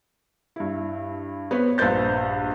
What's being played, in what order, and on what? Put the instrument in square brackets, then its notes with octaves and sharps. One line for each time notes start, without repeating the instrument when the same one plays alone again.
[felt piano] G2 E4
B3 C4 B4 C#5
A#1 G2 B4 C5 G6 A6